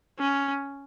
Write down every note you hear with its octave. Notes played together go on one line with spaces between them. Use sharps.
C#4